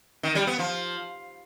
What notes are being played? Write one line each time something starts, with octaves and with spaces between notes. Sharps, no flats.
D#3
G3
B3
F3